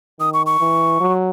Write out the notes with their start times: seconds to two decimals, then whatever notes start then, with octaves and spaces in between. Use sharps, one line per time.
0.20 D#3 D#6
0.33 C#6
0.46 C#6
0.60 E3
1.01 F#3